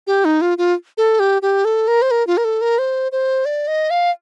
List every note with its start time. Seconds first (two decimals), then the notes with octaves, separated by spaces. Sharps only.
0.07 G4
0.25 D#4
0.41 F4
0.58 F4
0.98 A4
1.20 G4
1.42 G4
1.65 A4
1.88 A#4
2.02 C5
2.11 A#4
2.27 F4
2.37 A#4
2.45 A4
2.61 A#4
2.79 C5
3.12 C5
3.45 D5
3.68 D#5
3.90 F5